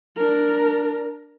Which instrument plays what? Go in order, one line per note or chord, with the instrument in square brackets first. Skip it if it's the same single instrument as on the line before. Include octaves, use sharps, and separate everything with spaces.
[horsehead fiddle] D4 A#4